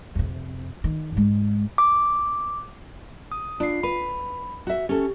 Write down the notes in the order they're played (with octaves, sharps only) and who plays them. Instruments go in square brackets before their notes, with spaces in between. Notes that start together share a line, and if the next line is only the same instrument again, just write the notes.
[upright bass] F2 C3
D#3
G#2 G#3
[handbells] D6
[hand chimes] D#6
[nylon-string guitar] D4 [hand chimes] F4 C7
[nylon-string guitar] B4 [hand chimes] B5
[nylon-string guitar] F#4 E5
[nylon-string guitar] C#4 A4 [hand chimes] G4